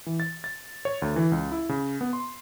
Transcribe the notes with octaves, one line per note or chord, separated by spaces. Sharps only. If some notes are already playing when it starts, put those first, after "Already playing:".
E3
A6
A6
C#5
D2
E3
C#2
E4
C#3
B3
C6